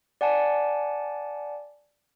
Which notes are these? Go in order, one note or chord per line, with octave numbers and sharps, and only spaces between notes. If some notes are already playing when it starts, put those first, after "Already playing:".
D5 F#5 G#5 A5